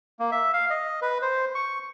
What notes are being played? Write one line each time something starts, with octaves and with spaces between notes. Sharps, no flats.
A#3
E5
F5
D#5
B4
C5
C#6